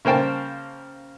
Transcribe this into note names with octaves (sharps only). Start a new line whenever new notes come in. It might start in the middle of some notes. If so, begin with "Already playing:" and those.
C#3 A#3 C5 G5 A5